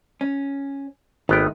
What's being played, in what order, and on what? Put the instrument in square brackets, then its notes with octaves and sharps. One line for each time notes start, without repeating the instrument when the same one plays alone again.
[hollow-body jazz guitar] C#4
[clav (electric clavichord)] G#1 B3 G5 [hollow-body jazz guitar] D#3 A3 D#4